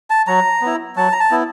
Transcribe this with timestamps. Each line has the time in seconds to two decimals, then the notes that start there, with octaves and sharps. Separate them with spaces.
0.10 A5
0.27 F#3 A#5
0.62 B3 E4
0.96 F#3 A5
1.12 A#5
1.20 A5
1.31 B3 E4